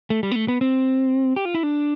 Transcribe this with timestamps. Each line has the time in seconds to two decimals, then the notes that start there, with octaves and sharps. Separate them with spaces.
0.10 A3
0.23 G3
0.31 B3
0.35 A3
0.48 B3
0.61 C4
1.36 G4
1.45 F4
1.55 E4
1.63 D4